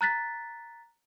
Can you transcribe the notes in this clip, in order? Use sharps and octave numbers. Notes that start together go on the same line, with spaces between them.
A#5 F#6 A6 B6